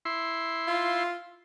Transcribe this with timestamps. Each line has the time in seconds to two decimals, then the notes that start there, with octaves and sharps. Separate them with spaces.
0.05 E4 C6
0.67 F4